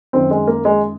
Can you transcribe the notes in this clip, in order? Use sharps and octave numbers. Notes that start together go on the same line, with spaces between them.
F#2 D#3 C4
G#3
A#3
G#3